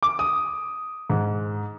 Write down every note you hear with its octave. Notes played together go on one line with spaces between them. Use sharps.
D6
D#6
G#2